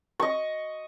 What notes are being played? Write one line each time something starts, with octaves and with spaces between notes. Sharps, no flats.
D#5 C#6